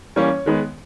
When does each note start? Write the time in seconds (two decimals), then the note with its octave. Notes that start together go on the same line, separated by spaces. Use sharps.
0.16 E3 G3 A#3 C#4 C#5
0.46 D#3 G#3 B3